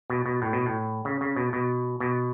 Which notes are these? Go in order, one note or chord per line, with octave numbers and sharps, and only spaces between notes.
B2
B2
A2
B2
A2
C#3
C#3
B2
B2
B2